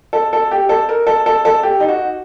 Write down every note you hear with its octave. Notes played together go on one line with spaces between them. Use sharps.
A4
A4
G4
A4
A#4
A4
A4
A4
G4
D#4
F#4